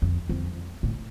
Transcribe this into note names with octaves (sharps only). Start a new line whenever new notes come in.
F2
F2
A2